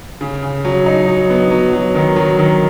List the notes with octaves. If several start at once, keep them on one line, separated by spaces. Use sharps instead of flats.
C#3
C#3
F#3
D#4
F#3
B3
F#3
F#3
D#3
F#3
D#3